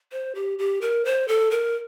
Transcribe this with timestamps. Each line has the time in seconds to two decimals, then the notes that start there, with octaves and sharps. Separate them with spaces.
0.12 C5
0.35 G4
0.59 G4
0.81 A#4
1.05 C5
1.28 A4
1.51 A#4